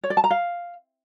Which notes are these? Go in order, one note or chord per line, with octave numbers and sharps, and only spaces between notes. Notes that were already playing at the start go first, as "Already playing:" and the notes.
C#5
D5
A5
A#5
F5